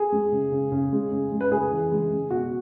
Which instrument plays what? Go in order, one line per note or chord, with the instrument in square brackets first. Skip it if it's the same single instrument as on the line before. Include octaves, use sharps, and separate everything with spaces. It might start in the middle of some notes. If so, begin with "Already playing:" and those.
Already playing: [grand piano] G#4
G#3
C#3
C#3
C#3
G#3
C#3
G#3
B4
C#3 G#4
E3
G#3
C#3
B2 F#4